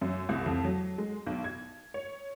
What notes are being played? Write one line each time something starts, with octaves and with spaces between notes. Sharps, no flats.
F#2
C2
F2
F#3
G#3
B1
G#6
C#5